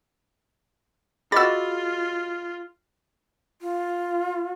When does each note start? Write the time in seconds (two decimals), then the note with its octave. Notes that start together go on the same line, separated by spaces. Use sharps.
1.32 F4 F#4 G#4 D#5 B5 E6 A6
3.62 F4